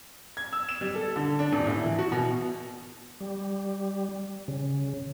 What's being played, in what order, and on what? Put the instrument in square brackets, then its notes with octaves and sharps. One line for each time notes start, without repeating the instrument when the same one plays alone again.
[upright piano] G#6
E6
E7
G3
A4
D3
D4
D#1
A2
E3
F#4
B2
[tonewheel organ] G3
C#3